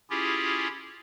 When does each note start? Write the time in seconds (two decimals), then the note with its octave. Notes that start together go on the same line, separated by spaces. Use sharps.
0.10 C#4 E4 F4 G4 G#4